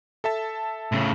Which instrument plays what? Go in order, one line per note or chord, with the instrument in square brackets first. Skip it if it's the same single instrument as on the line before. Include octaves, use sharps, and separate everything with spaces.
[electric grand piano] A4 E5 A5
[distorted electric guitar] A2 C#3